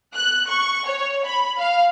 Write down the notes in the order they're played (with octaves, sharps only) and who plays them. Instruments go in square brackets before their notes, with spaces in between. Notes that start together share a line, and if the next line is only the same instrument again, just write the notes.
[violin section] F#6
C#6
C#5
B5
F5